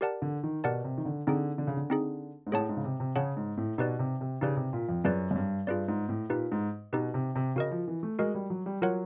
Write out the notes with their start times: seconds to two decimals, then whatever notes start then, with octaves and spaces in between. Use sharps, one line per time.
0.01 G4 A#4 D5 F#5 A5
0.22 D3
0.43 D#3
0.64 B2 G4 A#4 D5 F#5 A5
0.84 C3
0.98 D#3
1.05 D3
1.27 D3 C4 D#4 G#4
1.58 D3
1.67 C#3
1.77 D3
1.90 C4 D#4 G#4
2.47 G#2
2.52 A2 G#4 C#5 F#5 A5
2.69 G#2
2.77 C#3
2.84 C3
3.00 C3
3.16 C#3 G#4 C#5 F#5 A5
3.37 G#2
3.57 A2
3.78 B2 D#4 G4 B4 D5
3.99 C3
4.21 C3
4.41 C#3 D#4 G4 B4 D5
4.56 C3
4.73 A#2
4.88 F2
5.04 F#2 F4 G#4 B4 D5
5.31 F#2
5.36 G2
5.67 G2 F4 G#4 B4 D5
5.88 G#2
6.09 A2
6.29 A#2 D#4 G4 B4
6.52 G#2
6.93 B2 D#4 G4 B4
7.14 C3
7.36 C3
7.55 C#3 F#4 A#4 D#5
7.71 F3
7.88 E3
8.03 A3
8.19 G#3 F#4 A#4 D#5
8.34 G3
8.50 F#3
8.66 G3
8.81 F#3 F4 A#4 C#5 F#5